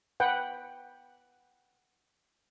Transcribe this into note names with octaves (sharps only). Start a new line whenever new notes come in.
B4 F#5 G5